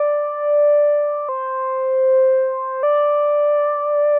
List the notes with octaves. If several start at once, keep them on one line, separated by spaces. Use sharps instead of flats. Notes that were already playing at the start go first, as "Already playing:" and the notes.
Already playing: D5
C5
D5